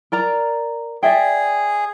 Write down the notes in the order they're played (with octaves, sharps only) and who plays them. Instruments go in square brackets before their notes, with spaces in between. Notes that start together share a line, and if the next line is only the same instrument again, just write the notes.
[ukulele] A#4 D5 A#5
[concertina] G#4 [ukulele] D5 E5 G5